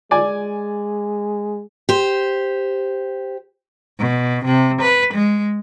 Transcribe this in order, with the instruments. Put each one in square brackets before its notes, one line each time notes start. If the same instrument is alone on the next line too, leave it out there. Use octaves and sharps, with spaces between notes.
[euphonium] G#3 [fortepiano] D5 G#5
[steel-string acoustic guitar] G4 C5
[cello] B2
C3
B4
G#3